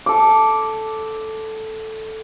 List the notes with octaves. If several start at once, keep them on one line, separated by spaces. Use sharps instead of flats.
A4 D6